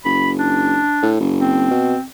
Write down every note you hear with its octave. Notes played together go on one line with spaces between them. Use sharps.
F#1 B5
D4
A2
F#1
C4
B2